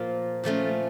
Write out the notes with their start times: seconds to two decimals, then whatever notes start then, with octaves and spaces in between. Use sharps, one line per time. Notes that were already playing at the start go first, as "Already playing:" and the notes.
Already playing: A#2 F3 A#3 F4
0.44 A#2 F3 A3 C#4